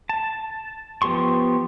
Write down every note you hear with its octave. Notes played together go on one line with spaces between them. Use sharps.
A5
F3 B3 G4 C6 C#6